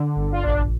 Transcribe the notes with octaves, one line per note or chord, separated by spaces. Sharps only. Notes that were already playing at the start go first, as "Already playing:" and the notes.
Already playing: D3
G1
F4
A#1 D4